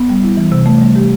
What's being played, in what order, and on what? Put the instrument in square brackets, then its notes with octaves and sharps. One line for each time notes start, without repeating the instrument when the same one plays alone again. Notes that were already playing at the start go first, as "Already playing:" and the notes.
Already playing: [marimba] B3
G3
E4
E3
C3
A3
G3
G4